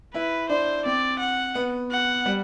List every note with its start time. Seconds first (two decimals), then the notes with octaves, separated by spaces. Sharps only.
0.15 E4 B4
0.49 D4 C5
0.85 C4 D5
1.20 F#5
1.55 B3
1.91 F#5
2.26 G3